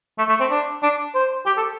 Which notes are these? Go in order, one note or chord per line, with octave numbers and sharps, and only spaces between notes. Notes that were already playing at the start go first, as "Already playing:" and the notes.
A3
A3
C4
D4
D4
C5
G4
A4